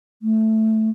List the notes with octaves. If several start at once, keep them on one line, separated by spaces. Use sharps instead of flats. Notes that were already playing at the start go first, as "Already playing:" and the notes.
A3